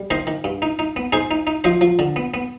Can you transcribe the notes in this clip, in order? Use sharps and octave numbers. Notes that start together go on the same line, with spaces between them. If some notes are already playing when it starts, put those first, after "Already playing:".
Already playing: G3
D#3 C5 D#5
D#3
G2
D#4
D#4
B3
D#4 G#4 C5
D#4
D#4
F3 C5 D#5
F3
D3
B3
B3